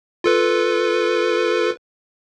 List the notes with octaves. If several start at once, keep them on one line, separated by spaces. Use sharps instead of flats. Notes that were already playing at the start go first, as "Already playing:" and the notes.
F4 A4 B4